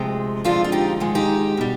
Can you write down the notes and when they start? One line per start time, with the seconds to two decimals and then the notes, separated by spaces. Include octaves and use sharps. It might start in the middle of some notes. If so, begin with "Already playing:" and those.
Already playing: D2 C3 F3 G#3
0.44 F2 D3 F3 G#3 D4 F4
0.64 F4
0.72 D#4 G4
1.00 G#2 D#3 G#3
1.15 D#4 G4
1.57 B2 G3